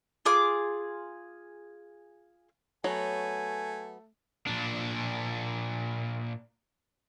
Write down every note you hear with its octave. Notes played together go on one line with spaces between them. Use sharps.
F4 G#4 D6
F#3 A3 B3 C#5 G#5
A#2 D4